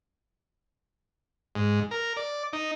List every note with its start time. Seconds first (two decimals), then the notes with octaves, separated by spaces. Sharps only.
1.55 G#2
1.91 A#4
2.17 D5
2.53 D#4